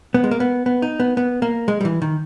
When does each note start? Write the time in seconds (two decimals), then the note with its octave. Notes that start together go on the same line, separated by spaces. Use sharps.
0.14 B3
0.24 G#3
0.31 A#3
0.40 B3
0.66 B3
0.82 D#4
1.00 B3
1.17 B3
1.42 A#3
1.68 G#3
1.81 G3
1.85 E3
2.02 D#3